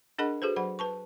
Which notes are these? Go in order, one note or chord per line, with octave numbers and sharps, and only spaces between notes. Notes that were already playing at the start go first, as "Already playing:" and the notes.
D4 G#4 A#4 D#5 F#5 B5
F#4 G#4 A4 B4 C5
F#3 C5 F#5 B5
B4 A5 C#6